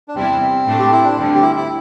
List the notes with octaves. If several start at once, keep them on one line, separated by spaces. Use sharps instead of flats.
D4
E2 C3 G3 C4 E4
A2 A3 D4
G4
E4
D4
D2 D3 G3 C4
G4
E4
E4